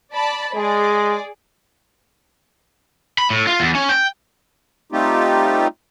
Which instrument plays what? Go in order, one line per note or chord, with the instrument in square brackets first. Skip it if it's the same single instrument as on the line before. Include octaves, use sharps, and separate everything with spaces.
[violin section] D5 A5 B5
[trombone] G#3 [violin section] G#4 D5
[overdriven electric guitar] B5
A2
F4
E2
C#4
G5
[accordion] G3 A3 C4 D#4 F4 G4